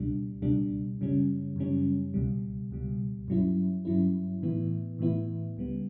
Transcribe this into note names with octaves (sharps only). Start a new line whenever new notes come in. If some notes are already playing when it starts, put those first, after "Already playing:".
Already playing: C#2 B2 G3 D4
C#2 B2 G3 D4
F#2 C#3 G3 C#4
F#2 C#3 G3 C#4
C#2 B2 G3
C#2 B2 G3
G2 F#3 C#4 E4
G2 F#3 C#4 E4
A2 E3 B3 E4
A2 E3 B3 E4
C#2 C#3 G3 B3